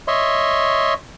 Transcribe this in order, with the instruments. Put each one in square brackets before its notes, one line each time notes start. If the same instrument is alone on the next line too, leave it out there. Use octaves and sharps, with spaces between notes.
[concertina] C#5 D#5 E5 C6